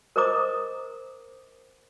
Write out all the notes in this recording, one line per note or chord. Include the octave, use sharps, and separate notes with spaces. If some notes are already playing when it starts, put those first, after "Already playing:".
A#4 C5 D#5 A#5 D6 D#6